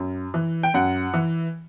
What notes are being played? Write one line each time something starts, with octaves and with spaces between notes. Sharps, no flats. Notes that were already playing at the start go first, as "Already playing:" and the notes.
Already playing: F#2
E3
G5
F#2 F#5
E3